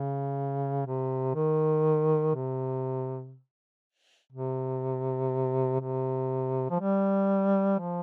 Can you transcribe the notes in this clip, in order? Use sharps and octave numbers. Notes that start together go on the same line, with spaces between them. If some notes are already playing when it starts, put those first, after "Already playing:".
Already playing: C#3
C3
D#3
C3
C3
C3
F3
G3
F3